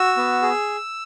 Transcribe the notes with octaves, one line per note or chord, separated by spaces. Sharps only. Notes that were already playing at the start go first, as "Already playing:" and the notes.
Already playing: F#4 E6
B3
G#4